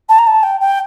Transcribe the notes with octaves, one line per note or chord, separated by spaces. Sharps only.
A5
A#5
A5
G5
G5